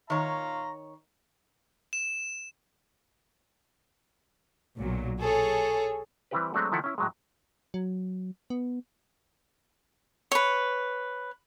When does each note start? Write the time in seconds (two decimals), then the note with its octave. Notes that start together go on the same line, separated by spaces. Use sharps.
0.10 D#3 C#5 F5 A#5 C6
1.93 E7
4.76 B1 A#2 F#3
5.20 G#4 A4 C#5
6.31 E3 G3 C4 E4 G4 B4
6.54 F#3 G#3 A3 C4 D4 F#4
6.72 D#3 F3 E4 A4 F#5 A5
6.84 C#4 E4
6.98 A2 F#3 G#3
7.74 F#3
8.50 B3
10.32 B4 C#5